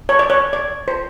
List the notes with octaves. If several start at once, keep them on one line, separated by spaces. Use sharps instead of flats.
C#5
D5
C#5
D5
C5